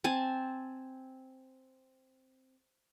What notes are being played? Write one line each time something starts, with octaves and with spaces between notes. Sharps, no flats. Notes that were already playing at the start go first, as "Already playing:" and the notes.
C4 G#5 A5